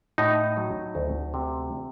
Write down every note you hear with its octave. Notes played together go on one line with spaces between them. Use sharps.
A2 D#4
F#3
D2
C3